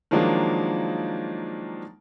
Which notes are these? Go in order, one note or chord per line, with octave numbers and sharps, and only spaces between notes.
D#3 F3 F#3 G#3 A#3 D4